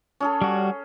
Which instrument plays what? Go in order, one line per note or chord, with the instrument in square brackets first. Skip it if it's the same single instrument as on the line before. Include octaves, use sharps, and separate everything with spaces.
[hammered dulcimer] C#4 G#4 A4
[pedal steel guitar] G3 F#4